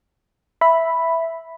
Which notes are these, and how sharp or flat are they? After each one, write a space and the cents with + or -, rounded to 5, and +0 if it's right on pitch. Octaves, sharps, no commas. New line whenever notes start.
E5 +0 B5 +0